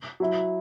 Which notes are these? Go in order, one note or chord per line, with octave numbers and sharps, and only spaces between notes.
F#3 E4